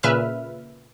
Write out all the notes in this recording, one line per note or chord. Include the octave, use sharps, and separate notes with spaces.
A#2 C#3 B4 E5 F6